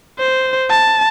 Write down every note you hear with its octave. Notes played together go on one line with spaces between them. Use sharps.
C5
A5